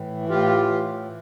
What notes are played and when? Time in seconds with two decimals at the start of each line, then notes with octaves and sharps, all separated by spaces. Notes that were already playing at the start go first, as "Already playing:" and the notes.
Already playing: A2 E3
0.29 A2 F4 G4
0.71 E3